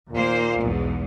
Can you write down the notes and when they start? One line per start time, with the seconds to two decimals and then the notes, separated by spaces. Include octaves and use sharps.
0.12 D#2 A#2 A#3 C5
0.60 B1 E2 G#2